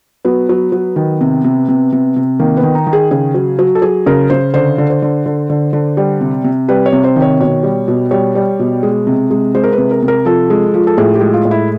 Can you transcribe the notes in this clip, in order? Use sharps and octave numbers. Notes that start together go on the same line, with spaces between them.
F#3 B3
F#3
F#3
D#3
C3
C3
C3
C3
C3
D#3 A#3
B3
D#3
D#4
D#3
G#4
C#3 G#4
F#3
F#3
A4
F#3 G#4
C#3 A#4
C#3 C5
D3 C5
D3
C5
D3
D3
D3
D3
G3
C3
C3
G3 B4
C#5
C3
C5
D#3
C#5
B2 C#5
G3
B2
G3 C#5
G3
B2
G#3
C3
G#3
G#3 C5
A#4
B4
C3
A#4
C3
A#4
F3 A4
G#3
F3
A4
A2 G#4
G4
G#3
F4
A2
E4